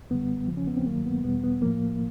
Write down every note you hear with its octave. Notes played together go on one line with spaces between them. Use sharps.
F#2 D3 G3 B3
E2 C#3 F3
C#4
B3
C4
G2 D#3 F#3 A#3
B3
E2 B2 G3 B3
B3
A2 F3 A#3